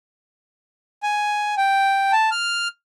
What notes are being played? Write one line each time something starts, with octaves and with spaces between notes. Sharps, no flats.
G#5
G5
A5
F6